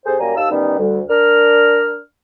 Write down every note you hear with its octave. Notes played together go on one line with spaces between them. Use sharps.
C3 G#4 A4 C5
F#2 G3 A#3 G#5 A#5
D#2 D#3 F5 A5 E6
D#3 E3 G3 B3 C#4 D#4
D2 G3
D4 A#4 F6